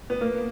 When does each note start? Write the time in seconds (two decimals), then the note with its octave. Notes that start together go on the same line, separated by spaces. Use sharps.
0.10 B3
0.21 A#3